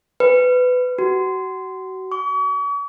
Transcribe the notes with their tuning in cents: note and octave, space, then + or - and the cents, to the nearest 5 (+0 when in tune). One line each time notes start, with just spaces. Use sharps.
B4 +20
F#4 +30
C#6 +45